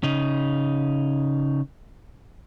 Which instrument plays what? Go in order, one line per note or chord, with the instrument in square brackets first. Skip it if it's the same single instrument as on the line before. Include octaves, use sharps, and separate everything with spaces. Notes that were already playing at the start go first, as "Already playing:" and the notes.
[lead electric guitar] C#3 D#4